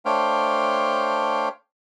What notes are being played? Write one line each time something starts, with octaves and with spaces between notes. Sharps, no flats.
A3 D4 C5 C#5 F5 G5